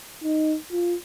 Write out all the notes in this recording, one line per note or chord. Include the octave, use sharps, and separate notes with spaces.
D#4
F4